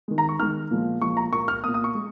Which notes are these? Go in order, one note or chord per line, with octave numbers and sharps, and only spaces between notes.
D#3 G#3
A#5
C#6
D#3 G#3 F6
A#2 F3 G#3
A#2 F3 G#3 C#6
A#5
A#2 A#3 C#6
F6
A#2 A#3 D#6
D#6
C#6
G#3